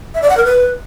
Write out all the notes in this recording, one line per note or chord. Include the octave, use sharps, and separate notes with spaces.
E5
D5
F#5
A#4
B4